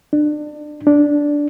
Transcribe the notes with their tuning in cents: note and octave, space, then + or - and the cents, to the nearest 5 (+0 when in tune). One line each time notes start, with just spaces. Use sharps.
D4 +25
D4 -10